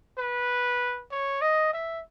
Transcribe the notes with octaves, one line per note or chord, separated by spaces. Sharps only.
B4
C#5
D#5
E5